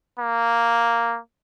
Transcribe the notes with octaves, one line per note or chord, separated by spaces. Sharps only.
A#3